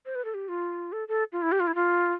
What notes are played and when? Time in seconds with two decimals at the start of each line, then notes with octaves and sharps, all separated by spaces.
0.06 C5
0.15 B4
0.25 A4
0.34 G4
0.49 F4
0.92 A4
1.08 A4
1.32 F4
1.42 E4
1.52 G4
1.60 F4
1.67 E4
1.75 F4